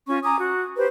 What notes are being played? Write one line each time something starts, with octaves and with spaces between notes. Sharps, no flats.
C#4 F4 C#6
G#5 A#5 D6 D#6
F#4
G4 B4 C5